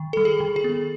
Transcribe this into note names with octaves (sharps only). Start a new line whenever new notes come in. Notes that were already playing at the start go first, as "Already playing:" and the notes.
Already playing: D#3
G3 A4
G#4
D#3
G#4
B3